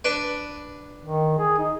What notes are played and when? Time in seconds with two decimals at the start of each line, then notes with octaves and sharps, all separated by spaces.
0.05 D4 B4
1.02 D#3
1.39 G#4
1.59 D#4